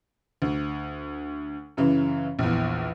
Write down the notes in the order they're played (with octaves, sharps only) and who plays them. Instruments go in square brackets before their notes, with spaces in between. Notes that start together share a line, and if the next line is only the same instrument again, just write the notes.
[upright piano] D2
F#2 C#3 E3
A#1 E2